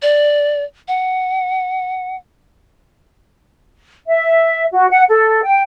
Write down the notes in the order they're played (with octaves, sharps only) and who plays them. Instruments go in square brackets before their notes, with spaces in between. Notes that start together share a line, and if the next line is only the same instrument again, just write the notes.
[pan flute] D5
F#5
[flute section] E5
F#4
F#5
A4
G5